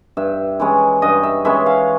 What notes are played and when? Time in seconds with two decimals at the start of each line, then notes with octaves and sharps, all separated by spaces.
0.17 G2 E5
0.60 E3 G#3 C#4
1.02 G2 D#5
1.23 E5
1.45 E3 G#3 C#4 E5
1.66 F5